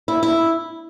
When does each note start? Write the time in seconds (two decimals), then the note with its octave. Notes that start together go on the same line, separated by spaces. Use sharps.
0.08 E4
0.23 E4